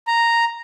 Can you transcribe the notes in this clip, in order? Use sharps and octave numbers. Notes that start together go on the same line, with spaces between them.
A#5